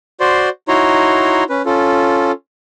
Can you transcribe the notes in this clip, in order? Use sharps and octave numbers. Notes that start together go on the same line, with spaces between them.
F#4 C5 D5 C6
D#4 E4 F#4 C#5 A#5 C6
C#4 B4
C#4 F4 A4